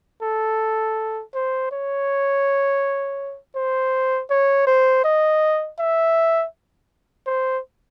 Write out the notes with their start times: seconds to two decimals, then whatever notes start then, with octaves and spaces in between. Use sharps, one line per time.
0.23 A4
1.34 C5
1.72 C#5
3.56 C5
4.30 C#5
4.67 C5
5.04 D#5
5.79 E5
7.26 C5